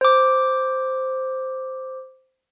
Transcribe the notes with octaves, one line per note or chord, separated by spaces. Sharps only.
C5 D6